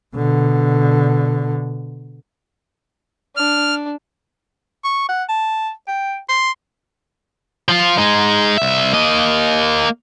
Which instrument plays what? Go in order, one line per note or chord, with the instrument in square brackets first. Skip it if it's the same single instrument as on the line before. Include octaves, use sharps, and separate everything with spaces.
[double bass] B2 D3
[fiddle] D4 [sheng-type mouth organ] F6
[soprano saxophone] C#6
F#5
A5
G5
C6
[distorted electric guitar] F3 F4
G#3 D#4
C2 E5
A#3 D#5